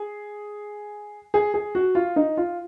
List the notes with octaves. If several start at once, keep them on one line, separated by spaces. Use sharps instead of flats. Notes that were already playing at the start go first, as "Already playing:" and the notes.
Already playing: G#4
G#4
G#4
F#4
F4
D#4
F4